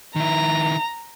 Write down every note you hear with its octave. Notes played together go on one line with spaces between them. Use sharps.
D#3 E4 A#5